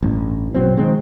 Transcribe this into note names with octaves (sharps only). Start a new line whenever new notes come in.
A1 G2
A#1 B2 F#3 C4
D#3 G#3 C4